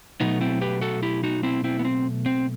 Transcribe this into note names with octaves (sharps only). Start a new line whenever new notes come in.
B2 F#3 A3 B3 D#4
C4 E4
G4 B4
F#4 A4
E4 G4
D#4 F#4
C4 E4
C4 E4
B3
C4
C4